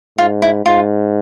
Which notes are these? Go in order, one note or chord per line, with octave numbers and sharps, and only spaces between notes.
G#2 F4
E4
G#2 F4